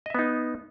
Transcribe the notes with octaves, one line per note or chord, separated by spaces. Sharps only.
B3 D#4 D#5 E5